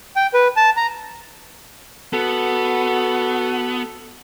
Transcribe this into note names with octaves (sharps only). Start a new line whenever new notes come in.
G5
B4
A5
A#5
B3 F#4 A4